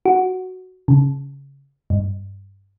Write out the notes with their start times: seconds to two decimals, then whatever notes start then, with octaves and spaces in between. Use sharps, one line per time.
0.05 F#4
0.88 C#3
1.90 G2